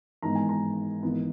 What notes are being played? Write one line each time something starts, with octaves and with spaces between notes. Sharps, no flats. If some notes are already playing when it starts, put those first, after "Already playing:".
G#1 G#2 E3 G#3 B3 A#5
G#5
A#5
G#1 G#2 E3 B3